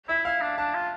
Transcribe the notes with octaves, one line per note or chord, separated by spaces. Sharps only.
E4 E5
E4 F5
D4
D4 A5
F4